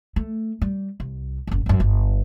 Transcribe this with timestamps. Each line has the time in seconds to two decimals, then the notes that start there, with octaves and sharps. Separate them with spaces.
0.16 A3
0.62 G3
1.00 C2
1.47 F#1 F#2
1.66 G#1 F#2
1.80 G1